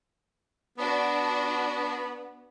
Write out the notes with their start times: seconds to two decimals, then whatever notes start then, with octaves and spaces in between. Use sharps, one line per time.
0.78 B3 D4 F#4